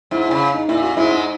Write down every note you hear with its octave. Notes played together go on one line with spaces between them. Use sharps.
G#2 E4
E4
C#3
D#4
A#2 E4
F#4
G#2 G#3 E4
D#4